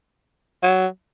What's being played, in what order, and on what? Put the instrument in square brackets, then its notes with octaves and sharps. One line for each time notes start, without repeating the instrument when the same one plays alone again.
[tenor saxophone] F#3